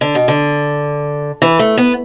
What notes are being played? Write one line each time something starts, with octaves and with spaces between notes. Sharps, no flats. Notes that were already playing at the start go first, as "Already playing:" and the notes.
D3
B2
D3
E3
A3
B3